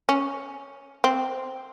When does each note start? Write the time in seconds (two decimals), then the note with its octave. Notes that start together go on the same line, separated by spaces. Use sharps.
0.09 C#4
1.04 C4